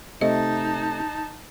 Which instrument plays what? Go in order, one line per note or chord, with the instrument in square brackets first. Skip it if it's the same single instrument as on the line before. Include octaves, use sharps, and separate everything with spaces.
[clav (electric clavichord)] C3 A3 [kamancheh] D#4 A5 [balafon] D#5